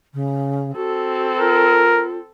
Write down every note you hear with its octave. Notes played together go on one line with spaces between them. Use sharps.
C#3
C4 F#4 A4
F4 A#4